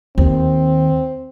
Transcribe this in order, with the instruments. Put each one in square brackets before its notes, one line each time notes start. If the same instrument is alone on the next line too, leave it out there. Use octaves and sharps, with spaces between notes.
[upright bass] D#2 [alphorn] C4